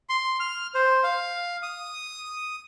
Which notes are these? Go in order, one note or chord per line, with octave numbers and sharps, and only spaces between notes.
C6
F6
C5
F5
D#6